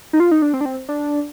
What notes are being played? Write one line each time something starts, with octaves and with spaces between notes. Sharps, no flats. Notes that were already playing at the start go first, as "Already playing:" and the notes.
D#4
F4
D#4
D4
C4
D4
C4
D4